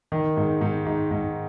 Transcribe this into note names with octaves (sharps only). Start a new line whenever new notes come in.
D#3
G#2
G#2
G#2
G#2